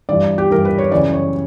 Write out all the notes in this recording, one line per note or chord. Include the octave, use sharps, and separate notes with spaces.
G2 E3 D5
G4
G2 E3 A#4
B4
C#5
F#2 C#3 E3 D5
C#5